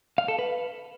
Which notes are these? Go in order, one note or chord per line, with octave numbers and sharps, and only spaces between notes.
F5
A4
B4